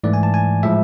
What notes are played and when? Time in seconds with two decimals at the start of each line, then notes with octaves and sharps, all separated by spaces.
0.04 G#2 E3 A3 D5
0.13 G#5
0.23 A5
0.34 G#5
0.63 A2 F3 G#3 E5